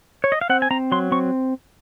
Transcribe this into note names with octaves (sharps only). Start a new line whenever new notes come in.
C#5
D#5
F5
C4 F#5
G#5
C4 A#5
F#3 C6
C4 C#6